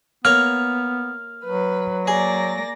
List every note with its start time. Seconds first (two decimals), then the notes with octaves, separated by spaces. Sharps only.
0.25 A#3 B3 A#4 C#5 F6
1.46 F#3 B4
2.08 A#3 G#4 D5 A#6